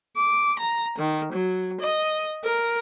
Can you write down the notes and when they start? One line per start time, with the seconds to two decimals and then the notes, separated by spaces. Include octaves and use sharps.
0.16 D6
0.59 A#5
0.98 D#3
1.32 F#3
1.80 D#5
2.44 A#4